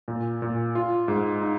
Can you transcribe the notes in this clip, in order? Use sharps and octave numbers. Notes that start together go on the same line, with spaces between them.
A#2
A#2
F4
G#2
D#4